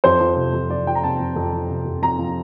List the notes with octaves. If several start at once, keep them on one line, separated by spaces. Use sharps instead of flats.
F2 C5
F3
C3
F2
F2 D5
F3 G5
A#5
C3 A5
F2
F2
F3
C3
F2
F2 A#5
F3